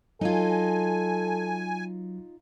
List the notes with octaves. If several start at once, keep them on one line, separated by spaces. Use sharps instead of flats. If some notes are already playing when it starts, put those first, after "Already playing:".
F#3 D#4 F4 A4 G#5